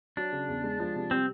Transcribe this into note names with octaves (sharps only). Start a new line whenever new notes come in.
F#3 D4
C#3
E2
G#3
F3
C3
G3 C4